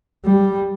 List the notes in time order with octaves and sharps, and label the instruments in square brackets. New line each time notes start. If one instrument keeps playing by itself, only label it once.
[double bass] G3